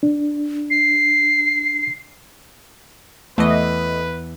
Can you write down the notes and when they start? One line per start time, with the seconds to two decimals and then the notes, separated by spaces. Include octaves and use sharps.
0.03 D4
0.70 C7
3.38 E2 E3 A3 B4 D#5